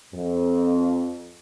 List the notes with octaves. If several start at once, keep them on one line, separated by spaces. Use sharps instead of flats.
F2